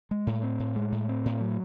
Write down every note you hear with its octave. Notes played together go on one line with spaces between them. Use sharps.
G#3
A2
C4
A2
G#3
A2
C4
A2
F#3